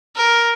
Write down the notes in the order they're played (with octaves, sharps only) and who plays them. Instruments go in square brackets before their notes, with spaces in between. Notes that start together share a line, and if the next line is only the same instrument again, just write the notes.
[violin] A#4